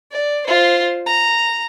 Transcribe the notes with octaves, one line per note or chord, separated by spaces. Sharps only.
D5
F4 C5
A#5